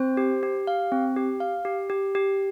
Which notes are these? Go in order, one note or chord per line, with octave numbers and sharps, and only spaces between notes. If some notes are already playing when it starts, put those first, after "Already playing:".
Already playing: C4 C5
G4
G4
F5
C4
G4
F5
G4
G4
G4